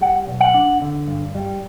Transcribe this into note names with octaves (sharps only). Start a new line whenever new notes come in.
G3 F#5
B1
F#5
D4
D3
G2
G3